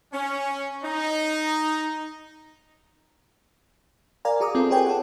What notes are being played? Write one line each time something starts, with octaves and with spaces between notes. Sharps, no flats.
C#4
D#4
A#4 D5 F5 G#5 A#5
F#4 G#4 A#5 D6 D#6
C4 F4 A4
G4 G#4 B4 C#5 G5 G#5
A4 F#5